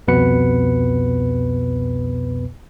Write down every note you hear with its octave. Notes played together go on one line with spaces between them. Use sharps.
C2 F2 B2 B3 B4 C#7